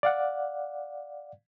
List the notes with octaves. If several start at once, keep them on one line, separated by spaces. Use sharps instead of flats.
D5 F5 F#5